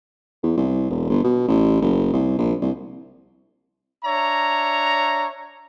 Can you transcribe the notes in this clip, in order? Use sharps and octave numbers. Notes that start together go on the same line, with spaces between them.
E2
C2
E1
G1
B2
A1
F#1
C2
A#1
C2
D4 C#5 E5 A#5